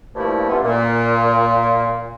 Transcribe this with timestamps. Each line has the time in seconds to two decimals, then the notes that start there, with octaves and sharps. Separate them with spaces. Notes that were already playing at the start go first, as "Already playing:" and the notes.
0.16 G2 A#2 F3 A3 E4
0.50 G2 A3 B3 C#4 F4
0.64 A#2